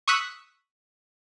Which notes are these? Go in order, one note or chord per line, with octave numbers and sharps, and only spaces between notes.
C#6 D#6 E6 F#6 B6